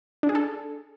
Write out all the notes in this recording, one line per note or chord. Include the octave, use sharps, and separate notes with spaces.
D4
G#4
A4